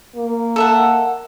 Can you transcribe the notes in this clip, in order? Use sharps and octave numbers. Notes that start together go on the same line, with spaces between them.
A#3
A4 E5 F#5